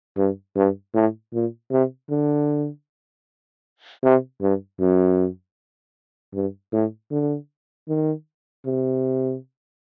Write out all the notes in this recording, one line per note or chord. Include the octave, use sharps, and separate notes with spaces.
G2
G2
A2
A#2
C3
D3
C3
G2
F#2
G2
A2
D3
D#3
C3